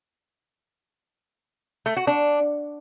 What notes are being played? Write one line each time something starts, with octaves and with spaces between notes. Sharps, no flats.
A3
F#4
D4